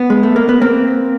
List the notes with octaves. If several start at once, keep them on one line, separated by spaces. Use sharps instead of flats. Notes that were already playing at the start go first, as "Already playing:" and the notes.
Already playing: B3
G#3
A3
A#3
B3
A#3 C4